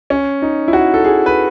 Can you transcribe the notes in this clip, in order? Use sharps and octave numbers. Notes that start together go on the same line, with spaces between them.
C#4
D#4
E4
F#4
A4
G#4
B4